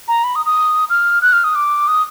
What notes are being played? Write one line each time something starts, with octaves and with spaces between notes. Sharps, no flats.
A#5
B5
D#6
D#6
F6
F#6
F6
D#6
D6
D#6